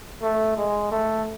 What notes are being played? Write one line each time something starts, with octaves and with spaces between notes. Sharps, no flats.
A3
G#3
A3